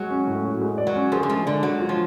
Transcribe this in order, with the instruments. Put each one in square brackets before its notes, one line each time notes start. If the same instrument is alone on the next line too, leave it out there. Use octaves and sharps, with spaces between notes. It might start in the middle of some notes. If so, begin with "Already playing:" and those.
Already playing: [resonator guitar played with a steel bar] F#3 [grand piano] G#3
[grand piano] C#4
A2
F#4
G#3
D5
[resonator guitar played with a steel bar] F#3
[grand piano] C#4
[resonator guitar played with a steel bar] F3 [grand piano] G#4
[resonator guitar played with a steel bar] D3
[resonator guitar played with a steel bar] F3 [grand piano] G#3
[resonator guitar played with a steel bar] D3 [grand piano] D5
[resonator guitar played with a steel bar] F#3 [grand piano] G#3
[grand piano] F4
[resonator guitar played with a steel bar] F3